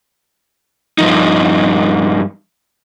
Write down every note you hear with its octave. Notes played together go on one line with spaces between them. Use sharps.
G2 F3 D#4